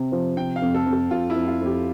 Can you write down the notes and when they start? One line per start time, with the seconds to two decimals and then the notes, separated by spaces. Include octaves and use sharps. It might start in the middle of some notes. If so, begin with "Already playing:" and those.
Already playing: C3
0.12 F3
0.37 C3 G5
0.56 F5
0.62 F2
0.74 A4
0.86 F2
0.93 A4
1.11 F2 F4
1.30 E4
1.36 F2
1.48 F4
1.61 F2 G4